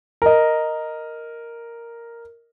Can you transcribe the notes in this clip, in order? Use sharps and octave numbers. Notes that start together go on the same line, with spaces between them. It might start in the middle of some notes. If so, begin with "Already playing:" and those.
A#4 D#5